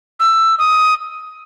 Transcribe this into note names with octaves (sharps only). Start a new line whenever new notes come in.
E6
D#6